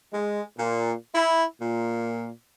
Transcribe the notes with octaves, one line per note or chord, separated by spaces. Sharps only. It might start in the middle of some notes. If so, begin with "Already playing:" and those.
G#3
A#2
E4
A#2